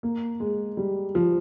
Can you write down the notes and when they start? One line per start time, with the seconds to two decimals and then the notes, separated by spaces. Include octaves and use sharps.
0.03 A#3
0.40 G#3
0.77 G3
1.15 F3